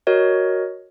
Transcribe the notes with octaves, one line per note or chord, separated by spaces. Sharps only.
F#4 A#4 C#5 D#5